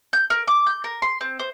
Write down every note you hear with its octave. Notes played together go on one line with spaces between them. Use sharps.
G6
A#4
D6
G6
A#4
C6
C4
C5